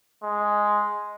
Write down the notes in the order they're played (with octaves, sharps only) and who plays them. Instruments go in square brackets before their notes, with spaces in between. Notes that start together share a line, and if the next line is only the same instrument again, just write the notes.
[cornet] G#3